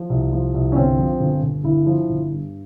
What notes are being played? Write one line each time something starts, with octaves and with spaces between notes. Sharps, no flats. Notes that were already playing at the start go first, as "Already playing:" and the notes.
Already playing: F3
C2
F3
C2
C#4
G1 C4
F3
G1
G1
G1 E4
F3
G1
G2